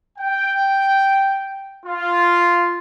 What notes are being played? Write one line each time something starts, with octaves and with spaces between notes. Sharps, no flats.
G5
F4